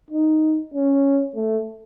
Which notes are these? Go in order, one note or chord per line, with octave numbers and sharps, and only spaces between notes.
D#4
C#4
A3